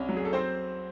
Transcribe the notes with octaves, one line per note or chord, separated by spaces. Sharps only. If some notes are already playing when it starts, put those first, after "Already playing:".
Already playing: C2 C#4
F#3
G#4
A4
C4 C5